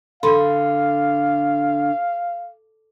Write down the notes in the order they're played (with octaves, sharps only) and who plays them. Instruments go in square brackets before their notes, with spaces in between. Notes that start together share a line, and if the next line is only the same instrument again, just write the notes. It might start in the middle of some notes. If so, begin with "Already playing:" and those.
[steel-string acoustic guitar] D3 [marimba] A4 B5 C6 [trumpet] F5